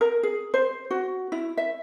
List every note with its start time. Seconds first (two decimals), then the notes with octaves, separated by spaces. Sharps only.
0.01 A#4
0.23 G#4
0.54 C5
0.91 F#4
1.32 E4
1.57 E5